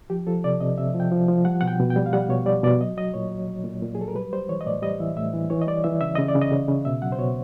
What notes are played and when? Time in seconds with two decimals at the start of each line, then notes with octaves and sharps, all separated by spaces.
0.10 F3 G4
0.27 F3 A4
0.44 C3 D5
0.61 C3 D#5
0.78 C3 E5
0.95 F3
1.00 G5
1.12 F3
1.28 F3
1.45 G3 F#5
1.61 B2 F#5
1.68 G5
1.80 B2
1.90 G5
1.96 G3
2.06 F5
2.13 G3 F#5
2.29 B2 C#5
2.46 G3 D5
2.63 B2 D5
2.80 F#3 D#5
2.97 F#3 D#5
3.14 A#2 C#5
3.31 F#3
3.48 F#3
3.64 A#2
3.82 A#2
3.95 G#4
3.99 F#3 A4
4.08 A#4
4.15 G3 B4
4.33 G3 C5
4.49 E3 C#5
4.61 D#5
4.66 A2 D5
4.82 G3 D#5
5.00 E3 E5
5.17 A2 E5
5.33 E3
5.50 E3 C#5
5.61 D#5
5.67 G3 D5
5.84 E3 E5
6.01 C#3 E5
6.15 C#3 D#5
6.28 D5
6.35 C#3
6.41 D#5
6.52 C#3
6.69 C#3
6.85 B2 E5
7.02 F#3 F#5
7.12 C5
7.19 B2 C#5